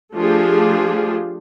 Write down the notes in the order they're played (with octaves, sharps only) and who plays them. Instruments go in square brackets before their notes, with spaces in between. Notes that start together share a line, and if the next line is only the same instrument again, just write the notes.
[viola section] F3 A3 D4 F4 G4 G#4